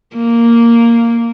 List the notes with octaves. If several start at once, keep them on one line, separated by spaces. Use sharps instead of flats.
A#3